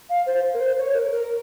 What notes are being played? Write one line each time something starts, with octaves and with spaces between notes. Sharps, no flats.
F5
C5
A#4
C5
C#5
A#4
A#4